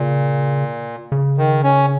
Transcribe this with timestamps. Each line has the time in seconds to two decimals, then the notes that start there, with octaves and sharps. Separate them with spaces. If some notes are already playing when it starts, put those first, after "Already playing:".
Already playing: A#2 C#3
1.12 C#3
1.38 D#3
1.64 C#4